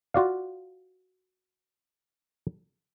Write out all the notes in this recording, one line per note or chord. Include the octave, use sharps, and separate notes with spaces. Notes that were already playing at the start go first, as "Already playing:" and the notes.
F4 F#4 D5 F5